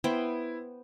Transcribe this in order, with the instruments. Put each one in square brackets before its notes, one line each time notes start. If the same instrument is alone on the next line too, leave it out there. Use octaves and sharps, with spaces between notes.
[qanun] B3 C5 G5 [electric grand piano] E4